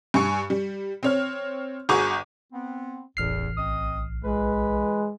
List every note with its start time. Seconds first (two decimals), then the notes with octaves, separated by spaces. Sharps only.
0.14 G2 G#5 C#6 C#7
0.50 G3
1.03 C4 C#5 F6
1.89 G1 F#4 G#4 A#5 C#6 D6
2.53 B3 C4
3.17 D#1 A1 E2 F6 C7
3.58 B1 C4 D#5 D#6
4.24 C#2 E3 G#3 B4